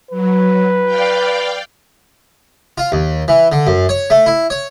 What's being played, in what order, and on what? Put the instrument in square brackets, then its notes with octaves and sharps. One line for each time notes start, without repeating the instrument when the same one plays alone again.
[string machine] F#3 [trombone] B4
[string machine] D5 F5 G5
[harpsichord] F4
D#2
E3
D3
F#2
C#5
A3
E4
C#5